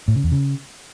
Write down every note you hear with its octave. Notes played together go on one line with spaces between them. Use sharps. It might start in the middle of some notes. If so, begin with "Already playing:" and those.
A2
C#3
E2
C#3